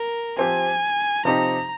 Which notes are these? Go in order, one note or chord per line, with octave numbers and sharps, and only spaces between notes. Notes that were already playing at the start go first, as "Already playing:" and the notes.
Already playing: A#4
F3 C4 G4 G#5
C3 F3 C4 D#4 G4 A#5